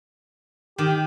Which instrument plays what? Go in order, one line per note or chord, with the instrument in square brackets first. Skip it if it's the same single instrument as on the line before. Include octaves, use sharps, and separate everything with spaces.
[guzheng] D#3 [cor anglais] G4